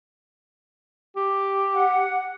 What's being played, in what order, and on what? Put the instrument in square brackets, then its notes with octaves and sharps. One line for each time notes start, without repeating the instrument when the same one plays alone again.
[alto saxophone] G4
[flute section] F#5